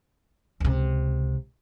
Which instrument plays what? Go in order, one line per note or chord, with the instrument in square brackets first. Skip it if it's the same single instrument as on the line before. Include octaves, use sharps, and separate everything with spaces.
[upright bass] C#2 C3